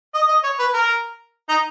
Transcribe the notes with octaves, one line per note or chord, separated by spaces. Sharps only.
D#5
D#5
C#5
B4
A#4
D#4